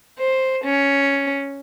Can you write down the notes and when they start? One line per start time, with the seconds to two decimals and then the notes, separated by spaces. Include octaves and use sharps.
0.18 C5
0.64 C#4